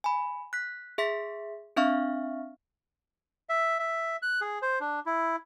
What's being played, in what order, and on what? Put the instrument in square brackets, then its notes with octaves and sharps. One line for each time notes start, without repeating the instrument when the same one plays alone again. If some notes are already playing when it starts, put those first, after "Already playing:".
[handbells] G#5 B5
F#6 B6
G#4 E5 C6 B6
C4 D4 E5 F5 C#6 F6
[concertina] E5
E5
F#6
G#4
C5
D4
E4